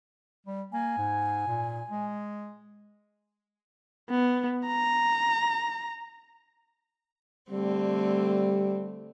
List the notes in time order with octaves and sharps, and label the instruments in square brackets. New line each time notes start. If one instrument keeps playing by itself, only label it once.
[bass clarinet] G3
[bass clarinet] A#3 [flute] G#5
[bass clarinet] G#2
A#2
G#3
[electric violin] B3
A#5
[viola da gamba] D3 A3 C4 [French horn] G3